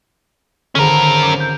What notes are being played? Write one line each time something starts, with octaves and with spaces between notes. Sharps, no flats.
G#1 D3 C#4 A#4
D6
G6